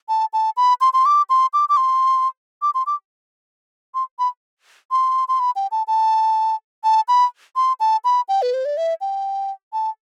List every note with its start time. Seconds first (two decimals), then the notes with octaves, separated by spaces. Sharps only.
0.09 A5
0.33 A5
0.57 B5
0.81 C6
0.93 C6
1.06 D6
1.30 C6
1.53 D6
1.69 D6
1.77 C6
2.62 D6
2.75 C6
2.87 D6
3.95 C6
4.19 B5
4.91 C6
5.28 C6
5.40 B5
5.56 G5
5.71 A5
5.88 A5
6.84 A5
7.08 B5
7.56 C6
7.80 A5
8.04 B5
8.28 G5
8.42 B4
8.54 C5
8.65 D5
8.77 E5
9.01 G5
9.73 A5